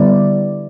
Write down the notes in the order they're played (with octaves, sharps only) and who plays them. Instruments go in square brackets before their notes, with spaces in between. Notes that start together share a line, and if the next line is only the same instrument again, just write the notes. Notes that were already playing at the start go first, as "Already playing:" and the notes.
Already playing: [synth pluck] D3 G3 B3 E4 D5